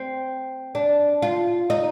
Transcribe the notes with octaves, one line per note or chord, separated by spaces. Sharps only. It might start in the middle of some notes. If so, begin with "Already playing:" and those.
Already playing: C4
D4
F4
D#4